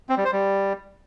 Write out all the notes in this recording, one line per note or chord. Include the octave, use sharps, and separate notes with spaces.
C4
G3
C5
G3